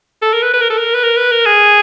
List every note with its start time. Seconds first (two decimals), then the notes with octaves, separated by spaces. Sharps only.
0.22 A4
0.33 A#4
0.42 B4
0.54 B4
0.62 A#4
0.70 A4
0.78 A#4
0.95 B4
1.04 A#4
1.17 B4
1.32 A#4
1.46 G#4